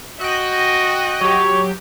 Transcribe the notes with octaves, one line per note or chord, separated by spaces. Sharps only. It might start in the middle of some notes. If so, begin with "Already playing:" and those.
F#4 D#5 G5 F#6
F#3 G4 C#5